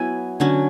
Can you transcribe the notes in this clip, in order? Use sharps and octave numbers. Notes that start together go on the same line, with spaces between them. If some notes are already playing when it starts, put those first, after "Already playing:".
Already playing: F#3 B3 E4 G#5
D3 F#3 C#4